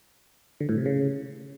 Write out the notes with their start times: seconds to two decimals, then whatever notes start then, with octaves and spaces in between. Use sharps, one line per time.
0.60 D3
0.69 A2
0.77 C3
0.86 C#3